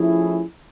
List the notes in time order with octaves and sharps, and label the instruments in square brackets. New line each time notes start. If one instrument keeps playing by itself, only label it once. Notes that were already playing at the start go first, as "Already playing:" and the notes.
Already playing: [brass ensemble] F3 A3 C#4 E4 G#4